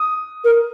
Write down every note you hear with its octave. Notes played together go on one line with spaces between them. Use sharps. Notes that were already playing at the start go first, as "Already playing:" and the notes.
Already playing: D#6
A#4